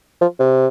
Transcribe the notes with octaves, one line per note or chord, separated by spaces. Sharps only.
F3
C3